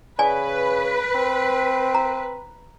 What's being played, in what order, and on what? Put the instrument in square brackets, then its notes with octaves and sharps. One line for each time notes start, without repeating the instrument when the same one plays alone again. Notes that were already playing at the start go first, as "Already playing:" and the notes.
[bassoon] C#3 [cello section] B4 [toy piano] D5 G#5
[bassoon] C4
[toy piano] A#5